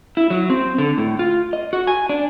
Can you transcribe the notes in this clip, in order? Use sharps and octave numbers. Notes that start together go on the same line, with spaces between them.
E4
F#3
C4
D3
A2
F4
D#5
F#4
G#5
D4